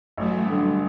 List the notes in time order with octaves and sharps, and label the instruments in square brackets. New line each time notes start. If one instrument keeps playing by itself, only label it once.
[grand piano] A1 [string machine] F#3 A3
[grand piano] G2 D3